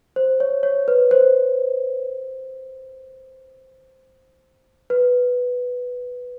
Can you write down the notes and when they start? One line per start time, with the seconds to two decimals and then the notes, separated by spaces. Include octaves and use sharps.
0.16 C5
0.40 C#5
0.63 C#5
0.88 B4
1.11 C5
4.90 B4